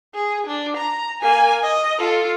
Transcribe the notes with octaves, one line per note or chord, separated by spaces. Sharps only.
G#4
D4
A#5
A#3 G#5
D#5
F4 A4